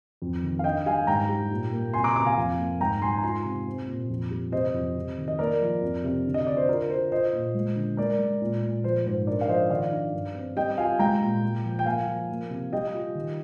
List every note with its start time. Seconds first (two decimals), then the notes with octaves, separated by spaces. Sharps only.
0.22 F2
0.43 D#3
0.59 F5
0.64 D4 D#5 G5
0.86 G3 F5 G#5
1.07 G#2 G5 A#5
1.29 G3
1.51 A#2
1.72 A#3
1.93 C3 G#5 C6
2.04 A#5 D6
2.15 C3 A#5 D6
2.26 F5 G#5
2.38 F2
2.58 A#3
2.81 G#2 G5 A#5
3.01 G#2 G#5 C6
3.18 A#5
3.23 F4 G#5 C6
3.44 C3
3.67 C4
3.88 A#2
4.10 F2
4.31 G3
4.52 C3 C5 D#5
4.74 F2
4.96 C3
5.18 D#3
5.28 D#5
5.39 A#3 A#4 D5
5.61 F3
5.82 F2
6.04 C3
6.26 D3
6.34 D#5
6.47 D3 D5
6.57 C5
6.68 F4 A#4
6.89 F4 C5
7.12 F4 C5 D#5
7.33 A#2
7.54 G#3
7.76 D3
7.97 G#3 A#4 D5
8.19 G#3
8.42 A#2
8.63 A#2
8.84 F3 C5
9.06 G#2 C5
9.27 D4 A#4 D5
9.41 F5
9.49 F3 C5 D#5
9.70 D#3 D5 F5
9.92 D4
10.13 G2
10.35 C4
10.56 G3 D#5 G5
10.78 F4 F5 G#5
10.99 G#3 G5 A#5
11.21 A#2
11.44 F4
11.65 F3
11.79 G5
11.86 A#3 F5 G#5
12.07 F3
12.30 A#3
12.50 C3
12.72 G3 D#5 G5
12.93 F4
13.15 D#3